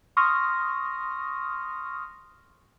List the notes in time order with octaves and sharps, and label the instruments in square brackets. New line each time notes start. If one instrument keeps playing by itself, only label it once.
[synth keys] C6 C#6 D#6 F6 A#6